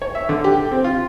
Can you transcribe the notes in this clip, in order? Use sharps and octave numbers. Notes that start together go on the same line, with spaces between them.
C#5
E5
D3
G4
C4
F4